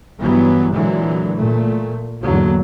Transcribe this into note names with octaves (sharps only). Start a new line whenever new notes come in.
G2 E3 F#3 B3
A#2 D3 E3 F#3 G#3
A#2 A3
E2 G#2 D3 F#3 A#3